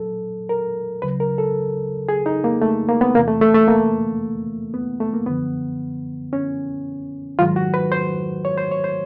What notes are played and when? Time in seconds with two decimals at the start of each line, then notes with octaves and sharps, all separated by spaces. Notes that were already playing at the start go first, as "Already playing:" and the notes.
Already playing: A#2 F#3 A4
0.49 A#4
1.02 D2 C#3 F#3 B4
1.20 A#4
1.38 A4
2.09 G#4
2.26 D#4
2.44 A#3
2.62 A3
2.89 A#3
3.01 B3
3.14 E2 C3 E3 A#3
3.27 A3
3.41 A3
3.55 A3
3.68 A#3
4.74 B3
5.00 A3
5.14 A#3
5.26 F#2 D3 F3 B3
6.33 C#4
7.39 G#2 D#3 F#3 F4
7.56 F#4
7.74 B4
7.92 C5
8.45 C#5
8.58 C5
8.71 C#5
8.84 C5